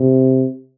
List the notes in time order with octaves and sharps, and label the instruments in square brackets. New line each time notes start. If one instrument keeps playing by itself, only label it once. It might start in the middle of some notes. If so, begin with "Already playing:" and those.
Already playing: [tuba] C3